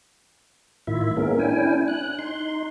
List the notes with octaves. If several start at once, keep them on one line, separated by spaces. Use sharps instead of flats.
A2 D#3 E4 F4 E5
G#3 A#3 B3 C#4 A#4
C#4 D4 E4 G5 G#5
F#6
D#4 C6